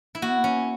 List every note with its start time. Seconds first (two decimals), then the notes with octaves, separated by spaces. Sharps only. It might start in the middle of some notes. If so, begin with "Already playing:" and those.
0.15 E4
0.22 A#3 F#4
0.30 B3
0.39 A#3
0.44 C#4